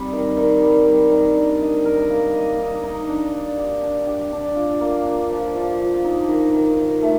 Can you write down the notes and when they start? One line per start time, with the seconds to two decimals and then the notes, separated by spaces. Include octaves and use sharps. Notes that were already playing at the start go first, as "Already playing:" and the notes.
Already playing: G3 C4 D#4
0.13 D#3
0.37 D#3
0.62 G3
0.86 G3
1.11 D#3
1.36 D4
1.61 D#5
1.85 A#4
2.10 A#3
2.35 D#5
2.59 D#4
2.83 D#4
3.09 D4
3.33 D4
3.58 G4
3.83 D4
4.07 G4
4.32 D4
4.56 F4
4.81 A#3
5.05 D4
5.31 F3
5.55 F3
5.80 F3
6.04 D#4
6.28 D#3
6.54 D#3
6.78 D#3
7.02 A3